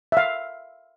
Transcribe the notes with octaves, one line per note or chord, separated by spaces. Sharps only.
E5
F5